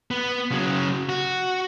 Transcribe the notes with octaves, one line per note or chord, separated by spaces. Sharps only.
B3
C#3 F#3
F#4